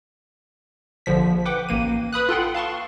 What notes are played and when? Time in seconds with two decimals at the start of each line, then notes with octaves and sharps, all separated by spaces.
1.06 A#1 D3 F3 B6
1.45 B4 F#5 G5 D6
1.69 A1 A#3 D#7
2.13 B4 B5 D#6 F#6
2.29 F4 A4 F#5 G5 C6
2.55 F5 A5 C6 C#6